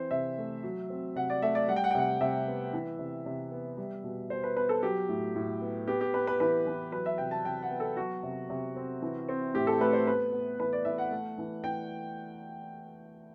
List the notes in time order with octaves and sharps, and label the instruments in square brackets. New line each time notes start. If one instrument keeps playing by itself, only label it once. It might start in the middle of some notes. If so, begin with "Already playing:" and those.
Already playing: [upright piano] E3 C4 C5
C3 E5
A3
F#3
C4
C3 F#5
D5
A3 E5
D5
G3 F#5
G5
F#5
G5
C3 F#5
C3 E5
B3
E3
C3
C3
B3
G3
B2
B2 C5
B4
B3 B4
A4
F#3 G4
A2
A2
B3
B3 G4
G4
B3 B4
B4
E3 B4
E3
F#3 B4
E5
C3 G5
A5
C3 G5
F#5
B3
A4
F#3 F#4
C3
C3
C4
E3
C4
A2 G4
A4
A3 B4
C5
B3 B4
B3
E3 B4
D5
E3 E5
F#5
A3
E3
E3 G5